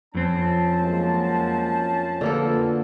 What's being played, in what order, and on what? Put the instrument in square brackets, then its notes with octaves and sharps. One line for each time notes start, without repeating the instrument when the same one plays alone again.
[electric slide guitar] F2 C4 [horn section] F3 C#4 A5
[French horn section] F#3 G#3 A#3
[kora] D3 A#3 A4 [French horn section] F4 F#4 B4